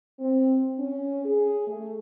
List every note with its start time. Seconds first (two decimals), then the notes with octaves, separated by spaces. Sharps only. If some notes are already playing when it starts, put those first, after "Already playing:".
0.20 C4
0.79 C#4
1.25 G#4
1.68 A3